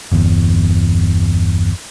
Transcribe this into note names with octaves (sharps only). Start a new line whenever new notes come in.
G1 E2